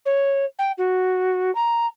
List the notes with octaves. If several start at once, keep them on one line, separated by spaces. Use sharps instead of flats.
C#5
G5
F#4
A#5